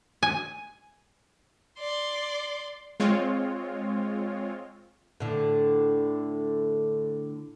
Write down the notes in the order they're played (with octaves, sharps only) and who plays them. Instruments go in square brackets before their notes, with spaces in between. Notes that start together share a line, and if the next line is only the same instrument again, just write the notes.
[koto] G#5
[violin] D5 C6
[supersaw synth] G#3 C4 F4 C#5
[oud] A2 D3